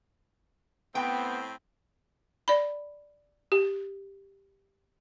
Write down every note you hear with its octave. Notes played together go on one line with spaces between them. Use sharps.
A2 B3 C4 G5
D5 B5
G4